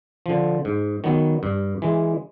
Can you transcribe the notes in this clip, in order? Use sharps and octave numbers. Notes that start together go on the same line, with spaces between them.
D3 F3
G#2
D#3 F#3 B3
G2
E3 G#3